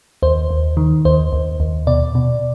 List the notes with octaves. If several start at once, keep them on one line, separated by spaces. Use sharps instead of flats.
D#2 C5
D#2
D#3
D#2 C5
D#2
D#2
B2 D5
B2